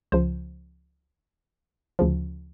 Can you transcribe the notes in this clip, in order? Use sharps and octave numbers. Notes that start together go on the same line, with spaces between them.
C#2 C#3 F3 C5
D2 C#3 F3